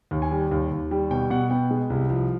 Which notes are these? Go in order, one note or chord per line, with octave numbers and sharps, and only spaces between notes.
D#2
G#5
G3
D#2
D#2
G3
B2 G5
B2 F#5
B3 G5
G#3
C2
F3